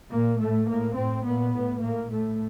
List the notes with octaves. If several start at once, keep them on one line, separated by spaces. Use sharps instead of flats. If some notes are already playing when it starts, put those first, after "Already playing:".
A#2 A#3
A2 A3
A2 A#3
A2 C4
A#2 B3
A2
A2 A#3
A2 A3